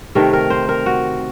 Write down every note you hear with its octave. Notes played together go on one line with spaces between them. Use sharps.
C3 D#3 A3 A#4
A#4
C5
A#4
F#4